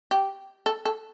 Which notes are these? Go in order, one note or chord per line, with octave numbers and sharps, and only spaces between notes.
G4
A4
A4